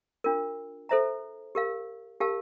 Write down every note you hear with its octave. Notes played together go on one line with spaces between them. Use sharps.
D4 F4 A#4
A4 C5 E5 A#5
G4 A#4 F5
G4 A#4 F5 A5